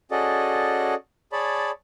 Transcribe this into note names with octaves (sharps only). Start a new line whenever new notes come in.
C#4 F#4 G#4 A4 D5 D#5
G#4 C#5 D5 A5 B5